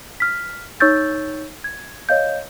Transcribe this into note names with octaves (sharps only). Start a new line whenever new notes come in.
F6 B6
D#4 C#5 C#6 E6 G6 A6
G#6
C#5 D#5 F5 G6